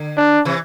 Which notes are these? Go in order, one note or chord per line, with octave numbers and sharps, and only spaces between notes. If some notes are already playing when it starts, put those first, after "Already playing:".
Already playing: D3
D4
C3 E3